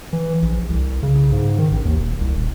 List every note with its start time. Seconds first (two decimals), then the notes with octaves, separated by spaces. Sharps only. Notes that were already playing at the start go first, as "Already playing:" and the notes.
0.13 E3
0.42 A#1
0.70 C2
1.03 C#3
1.32 G#2
1.59 D#3
1.71 A1
1.85 D#2
1.99 D#1
2.21 C2
2.36 D#1